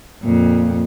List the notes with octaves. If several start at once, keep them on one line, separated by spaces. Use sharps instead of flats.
F2 A#2